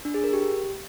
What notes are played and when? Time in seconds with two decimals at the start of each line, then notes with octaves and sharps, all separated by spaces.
0.05 D4
0.14 G#4
0.24 A#4
0.33 G4